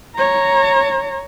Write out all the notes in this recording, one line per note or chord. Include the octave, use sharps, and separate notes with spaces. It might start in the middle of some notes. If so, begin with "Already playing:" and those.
C#5 A#5